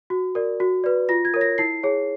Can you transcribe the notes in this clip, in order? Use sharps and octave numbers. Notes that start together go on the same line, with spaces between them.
F#4
A#4 D5
F#4
B4 D5
F4 A#6
G#6
A#4 C#5
A#6
E4 C7
G#4 C#5